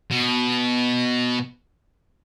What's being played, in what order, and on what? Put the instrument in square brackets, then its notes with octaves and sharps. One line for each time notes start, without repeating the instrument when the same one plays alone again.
[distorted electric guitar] B2